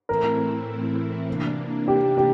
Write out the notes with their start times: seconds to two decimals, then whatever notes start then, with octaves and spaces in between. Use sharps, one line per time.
0.09 A2 E3 A3 C4 E4 A#4
1.28 C3 E3 A#3 D4
1.88 G4
2.18 G4